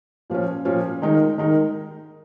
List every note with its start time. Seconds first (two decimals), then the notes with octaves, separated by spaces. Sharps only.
0.30 A#2 F3 C#4
0.65 A#2 F3 C#4
1.02 D#3 G#3 D#4 A#4
1.38 D#3 G#3 D#4 A#4